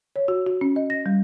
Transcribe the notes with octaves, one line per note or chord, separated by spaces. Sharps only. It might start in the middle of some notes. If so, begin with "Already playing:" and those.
C#5
F#4
F#4
C#4
D#5
A#6
G3